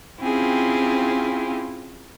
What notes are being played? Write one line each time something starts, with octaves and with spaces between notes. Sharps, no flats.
C4 C#4 E4 F4 G4 G#4